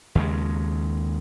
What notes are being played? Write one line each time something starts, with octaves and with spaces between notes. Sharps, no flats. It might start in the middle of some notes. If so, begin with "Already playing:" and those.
D#2 C#3 G#3